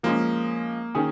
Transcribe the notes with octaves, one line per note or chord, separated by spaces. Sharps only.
F3 G#3 A#3 C#4
D#3 C#4 G#4